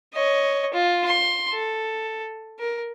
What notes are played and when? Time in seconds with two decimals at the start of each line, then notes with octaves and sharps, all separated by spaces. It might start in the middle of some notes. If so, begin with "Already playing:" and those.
0.14 C#5 D#5
0.74 F4
1.07 C6
1.52 A4
2.59 A#4